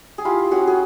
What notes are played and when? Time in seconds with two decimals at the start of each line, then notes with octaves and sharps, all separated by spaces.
0.18 G#4
0.25 E4 F4 G4
0.51 C#4 F#4 G#4
0.67 G#4